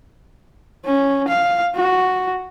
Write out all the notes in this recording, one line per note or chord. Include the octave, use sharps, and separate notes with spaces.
C#4
F5
F#4